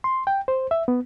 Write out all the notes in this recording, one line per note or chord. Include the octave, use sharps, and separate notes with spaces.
C6
G5
C5
E5
B3